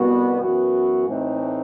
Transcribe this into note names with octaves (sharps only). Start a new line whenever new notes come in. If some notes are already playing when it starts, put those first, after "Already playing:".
Already playing: C2 B2 G3 B3 F#4
F#2 E3 B3 F#4
A2 E3 A3 C4 D#4